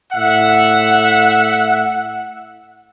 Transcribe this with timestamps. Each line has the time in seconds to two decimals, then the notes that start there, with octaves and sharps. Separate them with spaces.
0.13 A2 E5 F#5